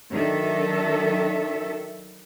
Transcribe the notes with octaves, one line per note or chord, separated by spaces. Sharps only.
D#3 F#3 D4 A4 E5